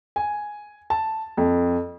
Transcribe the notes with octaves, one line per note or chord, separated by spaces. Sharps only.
G#5
A5
F2